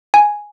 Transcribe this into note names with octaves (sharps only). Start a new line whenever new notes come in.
G#5